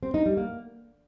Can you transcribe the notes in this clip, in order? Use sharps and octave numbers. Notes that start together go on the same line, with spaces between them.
C4
D#4
G3
A#3